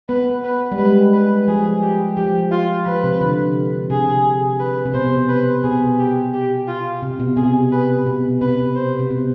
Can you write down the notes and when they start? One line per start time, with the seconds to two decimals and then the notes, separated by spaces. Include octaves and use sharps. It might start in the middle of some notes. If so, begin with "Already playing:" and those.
0.09 B3 B4
0.44 B4
0.72 G3
0.78 G#3 B4
1.14 B4
1.48 F3 G#4
1.82 G4
2.17 F3 G4
2.52 F4
2.86 F3 B4
3.04 C3
3.21 D3
3.90 C3 G#4
4.60 B4
4.85 C3
4.94 B2 C5
5.29 B4
5.64 B2 G#4
5.99 G4
6.33 G4
6.68 F4
7.03 C3
7.20 B2
7.37 C3 G#4
7.72 B4
8.06 B2
8.41 C3 B4
8.75 C5
9.00 C3
9.11 B2